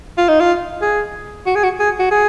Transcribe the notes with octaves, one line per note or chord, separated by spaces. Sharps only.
F4
D#4
F4
G#4
F#4
G#4
F#4
G#4
F#4
G#4